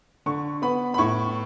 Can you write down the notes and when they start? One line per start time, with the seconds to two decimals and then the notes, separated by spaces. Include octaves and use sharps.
0.26 D3 C#6
0.62 B3 B5
0.94 B5
0.98 A2 C#6